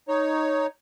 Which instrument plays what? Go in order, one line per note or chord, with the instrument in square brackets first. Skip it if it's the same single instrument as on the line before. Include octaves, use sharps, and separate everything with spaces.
[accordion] D#4 C#5